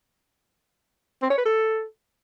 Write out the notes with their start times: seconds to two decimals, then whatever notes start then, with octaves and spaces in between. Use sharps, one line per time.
1.23 C4
1.30 C#5
1.38 B4
1.46 A4